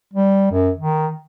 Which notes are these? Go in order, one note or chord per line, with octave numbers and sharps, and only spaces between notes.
G3
F#2
D#3